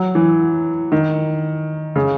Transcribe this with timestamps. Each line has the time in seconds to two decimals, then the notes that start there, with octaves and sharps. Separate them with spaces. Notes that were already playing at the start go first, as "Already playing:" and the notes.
Already playing: F#3
0.15 E3
0.92 D#3
1.96 C#3